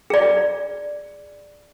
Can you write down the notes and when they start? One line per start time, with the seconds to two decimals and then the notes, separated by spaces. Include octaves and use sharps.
0.10 G#4 D5